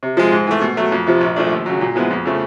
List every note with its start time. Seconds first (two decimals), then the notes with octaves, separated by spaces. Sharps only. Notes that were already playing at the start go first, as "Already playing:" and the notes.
0.03 C3
0.17 F3 G#3
0.32 G#2
0.47 E3 A3
0.61 B2
0.77 F#3 A3
0.92 F2
1.07 C3 F3
1.21 A#1
1.36 A#2 F3 A3 D4
1.52 D#2
1.66 C#3 F#3
1.81 A#2
1.95 F3 G#3 B3 E4
2.11 F2
2.25 C#3 F3 A3